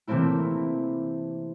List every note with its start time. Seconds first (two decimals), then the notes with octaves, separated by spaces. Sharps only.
0.07 C3 E3 A3 A#3 C4 E4